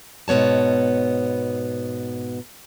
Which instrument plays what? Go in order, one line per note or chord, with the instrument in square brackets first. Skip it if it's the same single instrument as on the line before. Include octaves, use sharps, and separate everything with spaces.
[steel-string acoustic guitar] G#2 B2 B3 C#5 A5